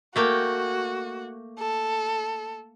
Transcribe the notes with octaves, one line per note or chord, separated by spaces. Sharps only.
A3 A#3 F#4 G5
A4